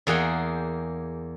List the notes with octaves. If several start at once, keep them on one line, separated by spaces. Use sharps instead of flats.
E2 A#3 G#4 F#5 G5